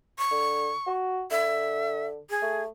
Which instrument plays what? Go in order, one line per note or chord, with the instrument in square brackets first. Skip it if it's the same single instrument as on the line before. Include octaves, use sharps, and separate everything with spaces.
[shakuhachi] C#6
[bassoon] D3
F#4
[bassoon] D3 [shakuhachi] E5
[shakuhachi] G#4
[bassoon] A3